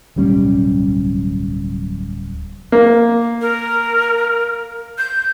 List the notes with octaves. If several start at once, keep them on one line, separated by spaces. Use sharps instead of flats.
D1 B1 G3 C#4
A#3
A#4
G6